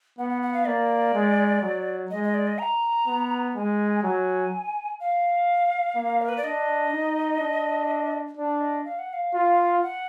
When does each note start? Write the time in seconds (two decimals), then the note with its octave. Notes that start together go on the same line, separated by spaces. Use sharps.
0.18 B3 F#5
0.30 F#5
0.42 F#5
0.54 F5
0.67 A#3 D5
1.14 G#3
1.62 F#3
2.11 G#3 D#5
2.23 D#5
2.34 D5
2.47 D#5
2.59 A#5
3.07 B3
3.56 G#3 G#5
4.03 F#3 G#5
5.00 F5
5.96 A#3
6.21 A#4
6.29 B4
6.37 D5
6.44 D4 D#5
6.93 D#4
7.40 D4
8.37 D4 D5
8.61 D#5
8.85 F5
8.99 F#5
9.13 F5
9.34 F4
9.82 F#5